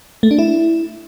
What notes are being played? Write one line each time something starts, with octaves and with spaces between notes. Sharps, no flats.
A3
D4
E4